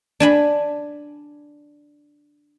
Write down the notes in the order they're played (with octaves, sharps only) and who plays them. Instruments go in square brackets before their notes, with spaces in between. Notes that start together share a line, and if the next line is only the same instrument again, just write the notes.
[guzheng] D4 G#5 B5